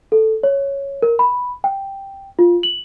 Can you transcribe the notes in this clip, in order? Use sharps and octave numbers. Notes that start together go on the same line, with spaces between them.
A4
C#5
A#4
B5
G5
F4
F#7